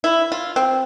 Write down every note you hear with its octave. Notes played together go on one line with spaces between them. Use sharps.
E4
F4
C4